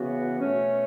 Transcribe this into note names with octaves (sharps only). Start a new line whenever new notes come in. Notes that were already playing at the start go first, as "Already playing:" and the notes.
Already playing: C#3 E3 B3 F#4
B2 A3 C#4